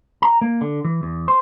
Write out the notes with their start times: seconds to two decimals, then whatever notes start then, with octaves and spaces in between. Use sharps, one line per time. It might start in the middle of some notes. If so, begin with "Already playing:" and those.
0.22 A#5
0.42 A#3
0.61 D3
0.84 E3
1.03 E2
1.28 C5